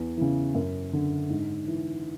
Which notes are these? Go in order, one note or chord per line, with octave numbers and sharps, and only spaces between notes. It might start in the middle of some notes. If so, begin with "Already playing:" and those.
Already playing: E2
C#3 E3
F#2
D3
G#2
E3